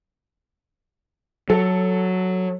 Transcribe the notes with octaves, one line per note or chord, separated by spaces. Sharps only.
F#3 A4